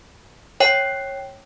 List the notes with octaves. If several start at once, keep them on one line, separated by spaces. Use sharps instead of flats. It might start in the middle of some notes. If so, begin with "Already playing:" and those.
C#5 G5